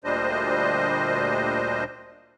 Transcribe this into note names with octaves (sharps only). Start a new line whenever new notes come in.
D2 A#2 G3 D4 C5 D#5